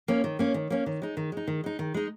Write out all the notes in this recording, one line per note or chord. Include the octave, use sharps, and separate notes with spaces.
A#3 C#4
D#3
A#3 C#4
D#3
A#3 C#4
D#3
G#3 D#4
D#3
G#3 D#4
D#3
G#3 D#4
D#3
G#3 D#4